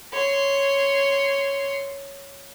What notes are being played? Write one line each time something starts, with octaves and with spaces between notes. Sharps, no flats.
C#5 C6